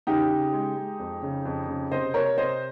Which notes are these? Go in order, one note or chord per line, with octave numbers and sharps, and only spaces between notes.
C#3 D#4 G4
C#3
G#3
G#3
F2
C#3
F2
C#3
C3 C5 D#5
C3 A#4 C#5
C3 C5 D#5